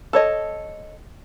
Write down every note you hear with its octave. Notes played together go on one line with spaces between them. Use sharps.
A4 C#5 D#5